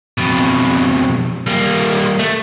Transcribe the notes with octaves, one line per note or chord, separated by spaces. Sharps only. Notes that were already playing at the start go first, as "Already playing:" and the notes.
F2 B2
G3 A#3
A3